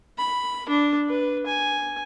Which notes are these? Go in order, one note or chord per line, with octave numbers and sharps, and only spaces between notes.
B5
D4
B4
G#5